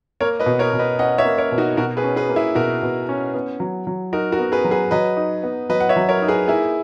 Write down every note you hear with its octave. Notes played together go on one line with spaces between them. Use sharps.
A#3 A#4 C#5
B4 D#5
B2
A#4 C#5
B2
B4 D#5
C#4 D#5 F#5
C#5 E5
A#3
A#4 C#5
B2
D#4 F#4
B2 F#4 A#4
G#4 B4
C#4
G#4 B4
A#3
E4 G#4
B2 F#4 A#4
B2
C#4
B3
F#3
F#3
D#4 F#4 A#4
F#4 A#4
B3
G#4 B4
F#3
G#4 B4
F#3 B4 D#5
D#4
B3
F#3 B4 D#5
F#5
C#5 E5
F#3
A#4 C#5
D#4
G#4 B4
A#3 E4 G#4